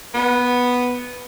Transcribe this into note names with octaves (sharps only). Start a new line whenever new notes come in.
B3